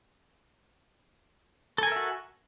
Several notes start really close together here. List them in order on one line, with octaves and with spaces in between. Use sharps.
A4 G#5 A#4 E5 F#4